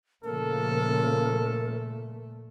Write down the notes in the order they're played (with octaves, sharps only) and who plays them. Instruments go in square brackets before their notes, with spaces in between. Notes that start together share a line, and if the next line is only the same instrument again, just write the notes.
[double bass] A#2 A3 [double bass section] C#3 F3 A#3 [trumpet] A4 [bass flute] A#4